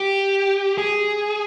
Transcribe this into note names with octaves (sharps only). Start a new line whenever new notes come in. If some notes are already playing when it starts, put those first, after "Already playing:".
Already playing: G4
G#4